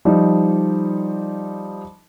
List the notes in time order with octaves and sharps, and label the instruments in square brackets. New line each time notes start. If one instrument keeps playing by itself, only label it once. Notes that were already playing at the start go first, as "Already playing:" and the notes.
[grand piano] F3 G3 D#4